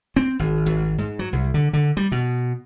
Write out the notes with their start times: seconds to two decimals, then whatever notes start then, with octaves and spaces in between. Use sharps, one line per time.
0.16 C4
0.39 G#1
0.66 G#1
0.98 G#2
1.19 F#3
1.33 C2
1.54 D3
1.73 D3
1.97 G3
2.12 B2